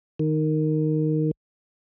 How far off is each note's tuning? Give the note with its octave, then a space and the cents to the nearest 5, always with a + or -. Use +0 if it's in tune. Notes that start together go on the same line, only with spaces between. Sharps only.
D#3 -5